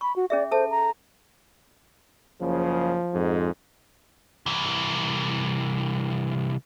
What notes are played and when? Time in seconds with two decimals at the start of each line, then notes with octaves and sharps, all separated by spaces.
0.01 B5 C#6
0.16 F#4
0.30 C#4 G#4 D5 E5
0.51 A4 C5 E5 A5
0.70 A#5
2.41 F#1 C#3 F3
3.14 F2 G#2
4.46 C2 E3